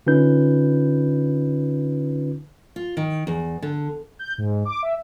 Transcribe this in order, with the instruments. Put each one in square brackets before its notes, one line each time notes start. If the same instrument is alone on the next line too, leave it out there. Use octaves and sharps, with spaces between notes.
[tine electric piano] D3 C#4 D#4 F4 B4 G6
[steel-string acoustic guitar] F4
D#3
E2
D3
[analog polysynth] G6
G#2
D6
E5